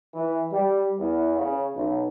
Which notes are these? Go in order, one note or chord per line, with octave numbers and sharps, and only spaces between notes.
E3
G3
E2
C#3
B1